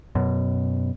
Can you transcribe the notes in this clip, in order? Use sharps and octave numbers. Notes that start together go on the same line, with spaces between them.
F#2 B2